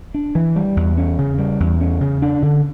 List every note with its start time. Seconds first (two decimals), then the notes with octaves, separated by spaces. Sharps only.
0.14 D4
0.35 E3
0.56 G3
0.77 E2
0.97 C#4
1.18 C#3
1.38 G3
1.60 E2
1.81 C#4
2.01 C#3
2.22 D4
2.42 D3